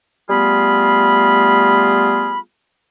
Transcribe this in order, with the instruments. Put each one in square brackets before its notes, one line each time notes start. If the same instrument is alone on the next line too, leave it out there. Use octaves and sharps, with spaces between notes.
[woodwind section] G3 A3 B3 F4 G#4 B5